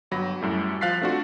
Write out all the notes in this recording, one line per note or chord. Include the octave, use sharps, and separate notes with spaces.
G1 F#3 B5 A#6
F#2 A2 G3
F3 F5 F#6 A6 B6 C7
A3 C4 D4 F4 F#4